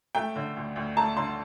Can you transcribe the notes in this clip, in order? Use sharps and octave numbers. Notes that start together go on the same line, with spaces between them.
A3 G5
D3
D2
D2
A3 A5
D3 C6